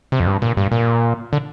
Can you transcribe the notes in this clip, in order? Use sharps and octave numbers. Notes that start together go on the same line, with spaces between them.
C3
F2
G2
A#2
G2
A#2
D3